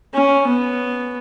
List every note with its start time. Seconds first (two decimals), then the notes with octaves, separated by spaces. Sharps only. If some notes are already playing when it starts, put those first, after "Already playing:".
0.14 C#4
0.47 B3